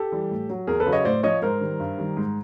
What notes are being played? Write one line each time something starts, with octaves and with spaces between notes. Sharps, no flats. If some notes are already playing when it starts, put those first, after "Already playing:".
Already playing: G4 A4
E3 G3
A2
F#3
E2 G#4 A#4
A4 B4
C#3 F#3
C#5 D#5
A2 C5 D5
F3 C#5 D#5
G#2 A#4 C5
D#3 G3
G2
D#3 G3
G#2